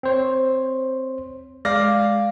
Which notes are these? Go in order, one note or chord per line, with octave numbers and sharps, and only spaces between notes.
C4 C5 C#5
G#3 D5 F5 A#6